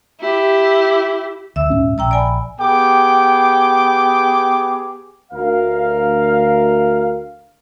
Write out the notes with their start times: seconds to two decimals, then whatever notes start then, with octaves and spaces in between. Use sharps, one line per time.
0.21 E4 G4
1.56 D2 E5 E6
1.70 D#1 G#2 C#4
1.98 A#1 G5 A#5 E6
2.11 D5 G#5 B5
2.60 B3 G4 G#4 G5 D6
5.32 D2 A#4 F5